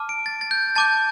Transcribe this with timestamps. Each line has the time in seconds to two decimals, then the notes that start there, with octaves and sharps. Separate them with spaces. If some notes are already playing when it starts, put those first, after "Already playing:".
Already playing: A5 D6 F6
0.09 D7
0.26 A6
0.41 A6
0.51 G6
0.76 A5 D6 G6 A6